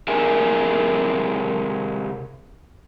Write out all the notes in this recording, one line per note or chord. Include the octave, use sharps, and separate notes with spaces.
C3 G#4 A#4 E5 G#5